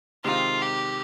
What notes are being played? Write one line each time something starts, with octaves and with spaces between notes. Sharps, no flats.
C3 D#3 G#3 C4 D#4 F4
G4